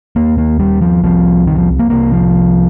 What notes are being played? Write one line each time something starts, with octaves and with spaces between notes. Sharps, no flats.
D#2 A#3
A#3
G3
F3
C2 C3 F3
D#3
F3
A#3
C2 C3 A#3
F3